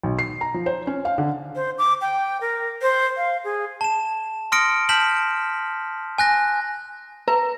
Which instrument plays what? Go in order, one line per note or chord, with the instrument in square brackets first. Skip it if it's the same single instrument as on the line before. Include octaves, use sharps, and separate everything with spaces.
[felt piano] B1
C7
A#5
F3
C5
C#4
F5
D3
[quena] C5
D6
G5
A#4
C5
F5
G#4
[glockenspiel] A5 E7
C6 D#6 F6 A#6 C#7 D7
A5 F6 G6 B6 E7 F#7
G#5 F#6 A#6
[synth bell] B4 [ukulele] A#5